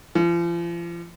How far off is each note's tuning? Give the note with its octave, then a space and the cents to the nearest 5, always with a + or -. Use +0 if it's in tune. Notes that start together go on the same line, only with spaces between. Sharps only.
F3 -40